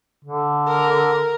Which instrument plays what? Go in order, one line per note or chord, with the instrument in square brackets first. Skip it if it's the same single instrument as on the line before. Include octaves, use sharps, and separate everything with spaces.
[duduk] D3
[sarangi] A#4